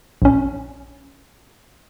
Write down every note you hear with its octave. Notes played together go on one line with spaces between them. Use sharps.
A#1 C#4